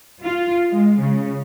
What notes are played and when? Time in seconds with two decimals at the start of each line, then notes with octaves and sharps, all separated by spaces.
0.24 F4
0.69 G#3
0.99 C#3